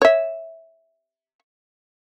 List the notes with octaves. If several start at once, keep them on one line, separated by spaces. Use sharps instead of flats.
C#5 E5